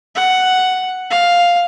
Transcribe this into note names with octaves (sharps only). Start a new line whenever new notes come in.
F#5
F5